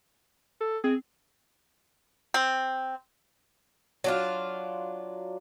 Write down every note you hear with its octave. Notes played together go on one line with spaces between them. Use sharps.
A4
C4 G#4
C4
F#3 D4 F4